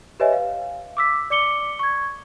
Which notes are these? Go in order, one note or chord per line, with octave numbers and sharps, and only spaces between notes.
G4 B4 C#5 D#5 E5 G#5
F5
D6 E6 B6
D5 D6 C#7 G7
C#6 G#6